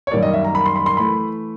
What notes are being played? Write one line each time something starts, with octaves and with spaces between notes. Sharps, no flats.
C#5
F#2 D#3 G3 A#3 D5
D#5
E5
A#5
B5
C6
B5
C6
E3 A3 B5